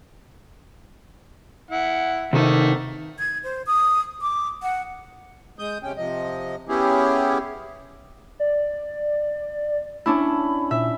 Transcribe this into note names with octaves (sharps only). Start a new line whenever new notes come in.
E4 F#5
C3 D#3 A3 A#3 D#4
G#6
C5
D#6
D6
F#5
G#3 D#6 G6
C3 C#4 G5
C3 F3 D#5
B3 C#4 E4 G4 G#4
D5
C#4 D4 E4 B5
A#2 E5